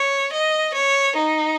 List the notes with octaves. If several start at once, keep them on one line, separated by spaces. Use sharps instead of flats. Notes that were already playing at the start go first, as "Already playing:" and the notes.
Already playing: C#5
D#5
C#5
D#4